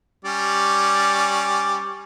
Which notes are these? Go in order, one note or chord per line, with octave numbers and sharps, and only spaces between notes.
G3 C#4 D5